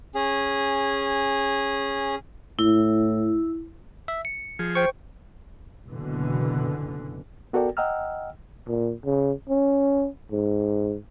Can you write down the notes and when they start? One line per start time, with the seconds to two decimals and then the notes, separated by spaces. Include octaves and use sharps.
0.15 C#4 G#4
2.59 A2 E4
4.08 E5
4.25 C#7
4.59 F3 G#4
4.75 C5 G5 C#6
5.88 F#1 B2 D3 E3
7.53 B3 F#4 A4 A#4 D5 G5
7.77 D#5 F#5 G5 A#5 E6 F6
8.67 A#2
9.05 C#3
9.49 C#4
10.31 G#2